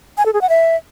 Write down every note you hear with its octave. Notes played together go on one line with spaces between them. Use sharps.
G#5
A4
G#4
F#5
E5